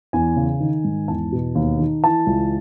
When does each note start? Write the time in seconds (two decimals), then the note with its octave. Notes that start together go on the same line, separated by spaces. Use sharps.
0.13 E2 G#5
0.37 C#3
0.60 D#3
0.84 G#2
1.08 E2 A5
1.32 B2
1.55 D#2
1.79 D#3
2.04 E3 A5
2.27 C#2